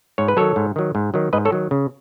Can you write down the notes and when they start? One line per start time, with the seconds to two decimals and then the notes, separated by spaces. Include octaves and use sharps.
0.18 G#2 C#5
0.28 B4
0.37 D#3 F#3 A4 C#5
0.56 G#2
0.76 D#3 F#3
0.95 G#2
1.14 D#3 F#3
1.33 G#2 B4 D#5
1.45 A4 C#5
1.52 D#3 F#3
1.71 C#3